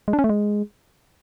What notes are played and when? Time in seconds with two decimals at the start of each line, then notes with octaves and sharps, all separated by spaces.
0.08 G#3
0.13 D4
0.19 C#4
0.24 A3
0.29 G#3